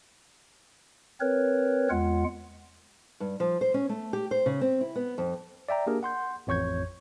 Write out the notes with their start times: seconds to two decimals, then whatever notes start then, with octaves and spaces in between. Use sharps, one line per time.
1.20 C4 A#4 B4 C#5
1.90 E2 G#3 F4 F#5
3.20 G2
3.40 F3
3.61 C5
3.74 C#4
3.89 A3
4.13 G4
4.31 C5
4.46 C#3
4.61 C4
4.81 E4
4.96 B3
5.18 F2
5.69 D5 E5 G5 A#5
5.87 A#3 D4 G4 G#4 A#4
6.03 F#5 C6 G6
6.47 A1 F2 C#5 C#6 G6 G#6